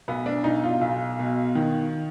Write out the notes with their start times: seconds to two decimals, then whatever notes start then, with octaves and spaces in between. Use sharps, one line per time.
0.08 B1 B3
0.26 D4
0.44 B2 D#4
0.64 F4
0.81 B1
1.19 B2
1.55 D#3